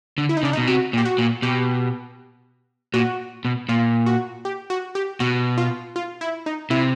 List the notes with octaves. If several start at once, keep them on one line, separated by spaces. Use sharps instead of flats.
D3
E4
D#4
C#3 D4
D#4
B2
C3 F#4
A#2
G4
F#4
A#2
B2 G4
A#2 F#4
B2
A#2 F4
F#4
G4
F#4
G4
B2 F#4
F4
F4
E4
D#4
C3 E4